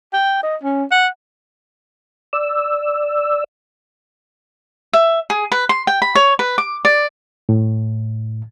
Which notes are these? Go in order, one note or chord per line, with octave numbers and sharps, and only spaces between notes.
G5
D#5
C#4
F#5
D5 E6
E5
G#4
B4
C6
G5
B5
C#5
B4
D6
D5
A2